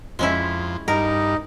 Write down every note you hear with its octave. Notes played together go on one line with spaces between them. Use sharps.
F2 G#3 C#4 E4
G2 D#4 A#4 D#5